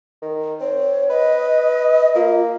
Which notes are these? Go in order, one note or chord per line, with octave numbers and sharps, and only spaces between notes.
D#3
C4 C#5
B4 D#5
A#3 F4